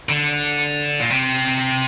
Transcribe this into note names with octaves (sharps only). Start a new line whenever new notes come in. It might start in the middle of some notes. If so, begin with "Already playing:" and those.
D3
A#2
C3